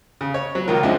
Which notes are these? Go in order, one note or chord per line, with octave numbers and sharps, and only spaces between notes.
C#3
C#5
F#3
C#2 D#3 F4 A#4
F3 G#3 C#4 D4 E4